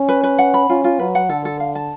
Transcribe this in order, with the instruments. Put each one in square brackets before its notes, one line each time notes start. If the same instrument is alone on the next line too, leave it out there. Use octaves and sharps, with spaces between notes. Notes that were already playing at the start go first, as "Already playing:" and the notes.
Already playing: [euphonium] C#4
[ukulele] B4
B4
F#5
B5
[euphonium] C#4 [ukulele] F4
[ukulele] F4
[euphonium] F#3 [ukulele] B4
[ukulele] F#5
[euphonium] D3 [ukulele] A4
[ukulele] A4
F5
A5